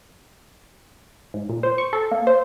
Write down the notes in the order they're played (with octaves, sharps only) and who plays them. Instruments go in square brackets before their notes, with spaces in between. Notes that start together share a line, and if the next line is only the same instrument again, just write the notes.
[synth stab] G#2
A#2
C5
C#6
A4
A#3
C5